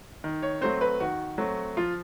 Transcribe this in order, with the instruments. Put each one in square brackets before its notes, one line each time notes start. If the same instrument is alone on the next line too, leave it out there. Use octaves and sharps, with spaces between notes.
[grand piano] D#3
[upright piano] C#5
[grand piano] F#3 A3 C4 [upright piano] C5
[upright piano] B4
[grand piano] D#3 [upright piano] F#4
[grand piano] F#3 A3 C4
[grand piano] F3 [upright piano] F4